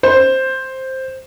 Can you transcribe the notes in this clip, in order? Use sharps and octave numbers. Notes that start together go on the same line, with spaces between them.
C5